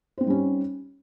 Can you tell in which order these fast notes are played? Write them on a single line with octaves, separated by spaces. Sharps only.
C5 C4 D#4 G3 C#4